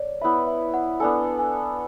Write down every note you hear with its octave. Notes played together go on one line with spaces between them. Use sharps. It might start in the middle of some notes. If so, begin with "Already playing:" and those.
Already playing: C#5 D5
B3 E4 B4 E5
E5
F#5
B3 D4 A4 G#5
G#5